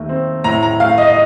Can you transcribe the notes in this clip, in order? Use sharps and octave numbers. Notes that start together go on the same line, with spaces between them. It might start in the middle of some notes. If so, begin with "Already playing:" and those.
Already playing: D#2 D#3 A3
C4
A2 A#5
A#5
A3 F5
D#5
D#5